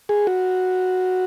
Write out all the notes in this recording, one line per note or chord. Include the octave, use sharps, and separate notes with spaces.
G#4
F#4